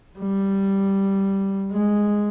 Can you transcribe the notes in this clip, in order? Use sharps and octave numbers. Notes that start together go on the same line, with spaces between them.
G3
G#3